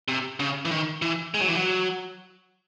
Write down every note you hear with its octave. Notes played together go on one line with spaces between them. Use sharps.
C3
C#3
E3
D#3
E3
G#3
F#3
E3
F#3